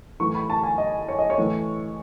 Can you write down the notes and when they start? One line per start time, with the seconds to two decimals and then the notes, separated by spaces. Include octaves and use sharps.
0.20 A2 E3 C#6
0.35 B5
0.50 A5
0.63 G#5
0.78 D#5
1.08 C#5
1.19 D#5
1.30 C#5
1.38 A2 E3